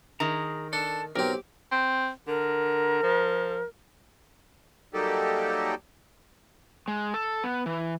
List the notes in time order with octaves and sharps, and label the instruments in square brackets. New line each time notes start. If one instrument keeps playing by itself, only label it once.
[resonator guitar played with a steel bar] D#3 [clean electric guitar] G#4 A#5
[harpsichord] D4 [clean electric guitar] A4
[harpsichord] B1 C4 [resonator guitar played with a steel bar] G4 [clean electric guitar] A#4
[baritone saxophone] C4
[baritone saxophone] D3 [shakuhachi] A#4
[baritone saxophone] F3
[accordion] F#3 G3 A#3 D#4 G4 A4
[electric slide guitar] G#3
A4
B3
E3